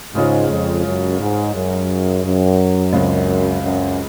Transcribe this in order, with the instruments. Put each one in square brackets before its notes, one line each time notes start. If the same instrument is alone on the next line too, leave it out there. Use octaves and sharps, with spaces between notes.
[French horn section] G#2 [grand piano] C#3 G#3 C#4 F4 G#4
[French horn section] F2
F#2
G#2
F#2
F#2
[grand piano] C#2 C#3 G#3 C4
[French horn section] F#2